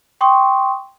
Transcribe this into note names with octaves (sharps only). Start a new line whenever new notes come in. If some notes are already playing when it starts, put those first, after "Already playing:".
G5 C6 C#6 D#6